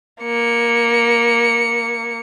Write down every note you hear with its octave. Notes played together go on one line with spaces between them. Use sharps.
A#3 C#7